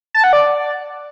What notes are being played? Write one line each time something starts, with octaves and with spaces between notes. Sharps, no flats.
A5
F#5
D5